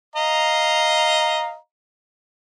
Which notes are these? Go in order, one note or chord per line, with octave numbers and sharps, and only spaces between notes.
D#5 F5 A#5